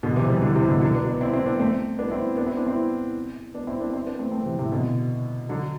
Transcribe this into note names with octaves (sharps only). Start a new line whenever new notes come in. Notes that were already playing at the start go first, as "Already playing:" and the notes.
B2 D3
F#3
C3 E3
E3 G3
D3 F#3
C3 E3
B2 D3
D3 F#3
B3 D4
B3 D4
C4 E4
C4 E4
B3 D4
A3 C4
B3 D4
C4 E4
B3 D4
C4 E4
B3 D4
C4 E4
B3 D4
C4 E4
B3 D4
C4 E4
B3 D4
A3 C4
A3 C4
C3 E3
A2 C3
B2 D3
D3 F#3